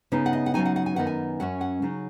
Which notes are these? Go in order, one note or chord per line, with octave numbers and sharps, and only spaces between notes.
C#3 B3 D#4
F#5
D#5
F#5
C#3 F#3 D#4 G#5
F#5
F#5
G#5
F#2 D#3 B3 D#4 F#5
G#5
F#2 F#3 C#4 F#5
F#5
C#3 F#3 D#4